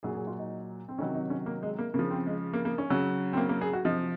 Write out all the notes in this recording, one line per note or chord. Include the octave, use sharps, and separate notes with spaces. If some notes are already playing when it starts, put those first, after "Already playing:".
A#2 F#3 G#4
G#4
F4
D#4
C4
C3 D#3 F#3 C#4
D#4
C#4
A#3
G#3
A#3
C#3 F3 A#3
C4
G#3
A#3
A#3
C#4
C#3 F#3
C4
A#3
A#3
G#4
F#4
C3 F3 D#4